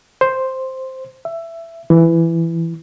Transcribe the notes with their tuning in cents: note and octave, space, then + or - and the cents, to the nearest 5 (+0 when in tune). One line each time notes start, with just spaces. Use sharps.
C5 +0
E5 +15
E3 +10